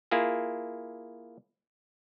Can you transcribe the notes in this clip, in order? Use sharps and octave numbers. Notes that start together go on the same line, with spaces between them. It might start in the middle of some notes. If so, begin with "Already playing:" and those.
A#3 E4 F4 G#4